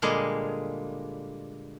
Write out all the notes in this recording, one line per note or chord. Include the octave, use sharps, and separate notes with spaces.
A#2 D3 G3 G#3 A#3 G#4